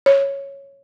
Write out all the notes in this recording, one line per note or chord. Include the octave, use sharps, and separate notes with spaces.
C#5